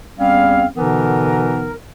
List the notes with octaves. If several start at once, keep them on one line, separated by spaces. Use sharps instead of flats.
E2 G3 C4 C#4 F5
B2 D3 E3 B3 D#4 A#4